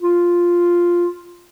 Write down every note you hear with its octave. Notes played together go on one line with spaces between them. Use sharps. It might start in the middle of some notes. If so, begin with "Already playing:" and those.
F4